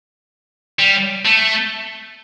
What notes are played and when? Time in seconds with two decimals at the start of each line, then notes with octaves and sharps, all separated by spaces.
0.79 G3
1.25 A3